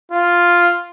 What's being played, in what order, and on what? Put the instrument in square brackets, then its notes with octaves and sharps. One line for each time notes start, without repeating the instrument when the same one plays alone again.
[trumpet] F4